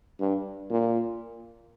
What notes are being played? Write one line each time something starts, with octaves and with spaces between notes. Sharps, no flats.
G2
A#2